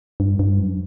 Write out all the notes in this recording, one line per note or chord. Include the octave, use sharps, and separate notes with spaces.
G2
G2
F#2